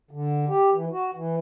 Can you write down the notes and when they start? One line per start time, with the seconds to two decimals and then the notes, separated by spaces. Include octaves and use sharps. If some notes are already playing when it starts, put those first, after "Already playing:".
0.11 D3
0.48 G4
0.72 E3
0.92 F#4
1.14 E3